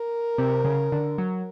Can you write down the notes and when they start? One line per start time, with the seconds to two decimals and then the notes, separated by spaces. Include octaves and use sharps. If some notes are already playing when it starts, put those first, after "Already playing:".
Already playing: A#4
0.38 C3
0.64 C#3
0.92 D3
1.18 F#3